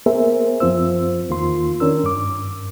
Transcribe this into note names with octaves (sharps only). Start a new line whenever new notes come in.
A#3 B3 G#4 A#4 C5 E5
F#2 F3 C4 F4 C5 E6
E2 D#3 A#3 F4 C6
D#3 C#4 D4 A#4 E6
G2 D6